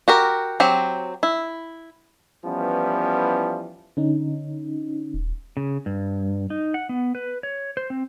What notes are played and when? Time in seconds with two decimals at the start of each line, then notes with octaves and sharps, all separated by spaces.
0.08 F#4 G4 A#4
0.60 F#3 C4 G4
1.23 E4
2.45 E3 F3 G3 B3 C#4 E4
3.97 D3 C#4 D#4
5.14 D#1
5.57 C#3
5.86 G2
6.50 D#4
6.74 F#5
6.89 B3
7.15 B4
7.43 C#5
7.77 C5
7.90 C4